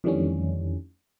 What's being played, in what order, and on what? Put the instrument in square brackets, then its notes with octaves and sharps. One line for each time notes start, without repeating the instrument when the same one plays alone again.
[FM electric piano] F2 D#3 E3 G3 A3 C#4